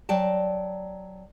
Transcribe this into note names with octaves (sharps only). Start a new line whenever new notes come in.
F#3 D5 G5 A5